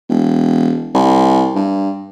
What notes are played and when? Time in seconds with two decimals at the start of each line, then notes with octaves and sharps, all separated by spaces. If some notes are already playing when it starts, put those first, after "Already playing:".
0.09 E1
0.94 C2
1.55 G2